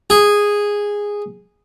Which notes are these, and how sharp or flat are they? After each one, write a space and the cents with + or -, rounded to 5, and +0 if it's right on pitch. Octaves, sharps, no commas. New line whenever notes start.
G#4 -10